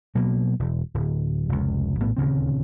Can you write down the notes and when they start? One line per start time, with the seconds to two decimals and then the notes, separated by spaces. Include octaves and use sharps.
0.15 B2 F#3 A#3
0.59 E1
0.94 D1
1.49 F1 C#2
2.00 A#1 A2 B3
2.17 D#1 D2 C#3 C4